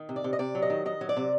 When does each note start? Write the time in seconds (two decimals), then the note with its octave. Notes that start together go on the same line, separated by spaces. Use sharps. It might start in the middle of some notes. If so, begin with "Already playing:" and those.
Already playing: D#3
0.09 C3
0.16 D5
0.24 C3
0.33 D#5
0.39 C3 D5
0.55 F#3
0.62 D#5
0.70 D#3
0.85 D#3 D#5
1.01 F#3
1.09 D5
1.17 C3